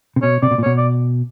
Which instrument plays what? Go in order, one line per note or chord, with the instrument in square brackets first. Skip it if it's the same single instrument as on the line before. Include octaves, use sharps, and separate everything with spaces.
[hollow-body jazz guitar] C3
[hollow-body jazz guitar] B2 [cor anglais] C#5
[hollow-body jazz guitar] C3 [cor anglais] D5
[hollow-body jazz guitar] B2
A#2
[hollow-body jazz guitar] B2 [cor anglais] C#5
[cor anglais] D5